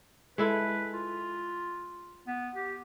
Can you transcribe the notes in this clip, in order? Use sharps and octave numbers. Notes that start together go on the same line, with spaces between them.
G#3 E4 A4 B4
F4
B3
G4